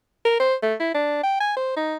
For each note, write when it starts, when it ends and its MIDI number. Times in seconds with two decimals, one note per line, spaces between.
0.25 0.38 70
0.40 0.54 72
0.63 0.74 57
0.80 0.90 64
0.94 1.21 62
1.23 1.37 79
1.40 1.55 80
1.56 1.76 72
1.77 1.97 63